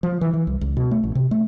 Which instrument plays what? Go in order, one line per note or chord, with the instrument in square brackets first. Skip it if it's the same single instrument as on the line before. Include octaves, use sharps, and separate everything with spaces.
[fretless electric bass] F3
E3
E3
C2
C#2
B2
A3
A1
C3
A3